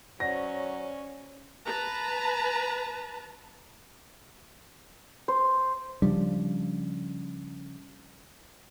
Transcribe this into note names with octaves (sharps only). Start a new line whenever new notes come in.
F#3 C#4 C5 D5 F#5 A#6
B4 A5 A#5
C5
C#3 F3 G3 D4